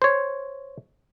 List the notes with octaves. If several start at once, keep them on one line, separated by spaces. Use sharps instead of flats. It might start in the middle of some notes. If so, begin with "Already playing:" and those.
C5 C#5